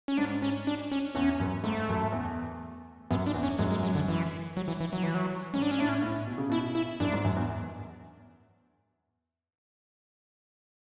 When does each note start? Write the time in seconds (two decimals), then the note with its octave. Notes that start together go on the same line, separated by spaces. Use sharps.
0.08 C#4
0.17 G#2 D4
0.42 C#4
0.67 D4
0.91 C#4
1.15 E2 C#4
1.40 F#2
1.63 G#2 A3
1.89 F#2
2.12 E2
3.11 F#2 B3
3.27 D4
3.34 E2
3.43 C#4
3.58 F#2 G#3
3.71 G#3
3.83 F#3
3.95 D3
4.08 E3
4.57 F#3
4.68 E3
4.80 E3
4.93 F#3
5.03 E3
5.14 F#3
5.54 G#2 C#4
5.62 D4
5.71 C#4
5.78 A2 D4
5.89 C#4
6.02 A2
6.26 B2
6.38 C#3
6.50 B2 E4
6.75 E4
7.00 F#2 D4
7.12 G#2
7.24 F#2
7.36 E2